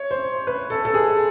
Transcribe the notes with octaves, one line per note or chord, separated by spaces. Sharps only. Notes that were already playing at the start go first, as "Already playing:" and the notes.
Already playing: C#5
C5
B4
A4
A4
G#4